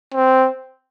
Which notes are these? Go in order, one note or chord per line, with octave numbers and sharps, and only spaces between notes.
C4